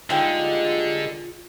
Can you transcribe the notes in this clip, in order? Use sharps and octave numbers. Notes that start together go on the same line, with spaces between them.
D3 G3 G#3 A#3 D#4 F4 G5